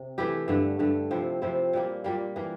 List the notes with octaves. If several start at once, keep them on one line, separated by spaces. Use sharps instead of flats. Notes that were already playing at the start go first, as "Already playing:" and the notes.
Already playing: C3
E3 A3 E4 G4
G2 D3 A3
G2 D3 A3
C3 F3 C4 E4
C3 F3 C4 E4
A#2 G3 A#3
A#2 G3 A#3
E3 A#3